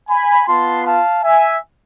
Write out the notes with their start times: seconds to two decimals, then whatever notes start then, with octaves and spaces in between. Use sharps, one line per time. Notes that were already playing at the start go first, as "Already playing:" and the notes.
0.08 G#5 B5
0.47 B3 F4 A5 C6
0.85 F5 A5
1.23 E5 G#5